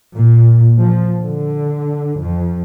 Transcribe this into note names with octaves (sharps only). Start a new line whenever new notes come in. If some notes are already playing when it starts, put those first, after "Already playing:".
A#2
F3
D3
F2